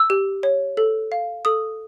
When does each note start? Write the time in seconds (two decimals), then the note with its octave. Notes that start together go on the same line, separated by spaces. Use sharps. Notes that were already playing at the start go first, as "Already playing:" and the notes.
Already playing: E6
0.10 G4
0.43 C#5
0.77 A4
1.12 F5
1.45 A4 D#6